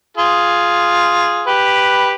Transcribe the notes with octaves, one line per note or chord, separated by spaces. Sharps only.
F4 G#4
G4 B4